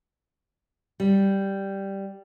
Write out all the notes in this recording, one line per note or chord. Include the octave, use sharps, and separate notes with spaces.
G3